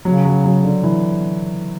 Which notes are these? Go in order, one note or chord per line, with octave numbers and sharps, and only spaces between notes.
C#3 F#3
F#3
F#3
D3
E3